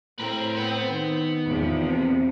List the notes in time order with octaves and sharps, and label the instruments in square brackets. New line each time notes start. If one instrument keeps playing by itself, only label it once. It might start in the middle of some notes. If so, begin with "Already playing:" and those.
[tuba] A2 [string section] C4 [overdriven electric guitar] A#4 B4
[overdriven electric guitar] B3 B4
[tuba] D#3
[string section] E2 C3 F3
[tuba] C4